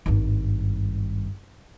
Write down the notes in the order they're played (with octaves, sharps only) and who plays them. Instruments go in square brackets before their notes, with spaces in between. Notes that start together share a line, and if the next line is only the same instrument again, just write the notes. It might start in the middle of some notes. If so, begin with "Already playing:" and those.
[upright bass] G#1 G2